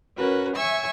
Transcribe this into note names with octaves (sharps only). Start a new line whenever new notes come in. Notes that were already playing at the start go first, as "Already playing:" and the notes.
C#4 F#4 A#4 B4
C#5 E5 G#5 C#6 E6